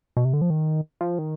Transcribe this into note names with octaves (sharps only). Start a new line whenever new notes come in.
B2
C3
D3
F3
D#3
F3
D#3